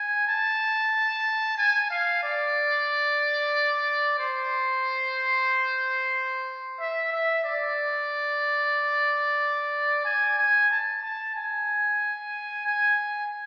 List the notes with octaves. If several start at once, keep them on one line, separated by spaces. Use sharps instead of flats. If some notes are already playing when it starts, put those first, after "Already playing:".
Already playing: G#5
A5
G#5
F5
D5
C5
E5
E5
D5
G#5
G#5
A5
A5
G#5
G#5